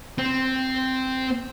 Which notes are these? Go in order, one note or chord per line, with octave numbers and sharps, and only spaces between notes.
C4